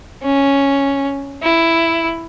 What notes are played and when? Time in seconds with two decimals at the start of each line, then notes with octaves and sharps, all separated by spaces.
0.23 C#4
1.42 E4